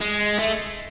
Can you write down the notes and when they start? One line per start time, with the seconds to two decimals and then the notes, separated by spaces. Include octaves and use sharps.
0.01 G#3
0.39 A3